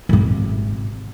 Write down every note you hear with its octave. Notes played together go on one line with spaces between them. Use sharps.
G#1 C3